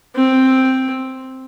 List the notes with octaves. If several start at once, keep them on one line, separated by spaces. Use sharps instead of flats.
C4